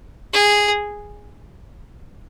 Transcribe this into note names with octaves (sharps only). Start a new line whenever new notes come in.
G#4